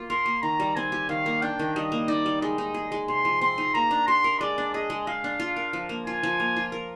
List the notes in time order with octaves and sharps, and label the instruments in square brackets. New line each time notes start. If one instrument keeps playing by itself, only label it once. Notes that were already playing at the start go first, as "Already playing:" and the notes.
Already playing: [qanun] A#3 F4
[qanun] A#4 [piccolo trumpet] C6
[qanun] A#3
[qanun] D#3 [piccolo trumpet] A#5
[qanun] G3
[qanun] C4 [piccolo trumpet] G#5
[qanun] G4
[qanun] D#3 [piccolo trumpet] F5
[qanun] A#3
[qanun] D4 [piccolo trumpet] G5
[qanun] D#3
[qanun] G3 [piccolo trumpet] D#5
[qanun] A#3
[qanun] D#4 [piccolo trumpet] D5
[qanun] G3
[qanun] G#3 [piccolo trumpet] D#5
[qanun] D#4
G#4
G#3
[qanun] C3 [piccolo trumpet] C6
[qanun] F3
[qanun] C4 [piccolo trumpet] C6
[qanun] D#4
[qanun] A#3 [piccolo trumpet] A#5
[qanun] D4
[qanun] G4 [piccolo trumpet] C6
[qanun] A#4
[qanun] G#3 [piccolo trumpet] D5
[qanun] D4
[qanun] G#4 [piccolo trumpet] D#5
[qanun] G#3
[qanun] G#3 [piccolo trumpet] F5
[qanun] D4
F4
A#4
F3
A#3
[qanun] F4 [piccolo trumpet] G#5
[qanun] F3
A#3
F4
A#4